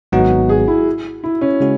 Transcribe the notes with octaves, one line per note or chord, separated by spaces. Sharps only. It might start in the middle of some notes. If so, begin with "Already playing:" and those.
G#1 G#2 F#3 B3 D#4 F#4
G#4
E4
E4
C#4
C#3 G#3 C#4 F#4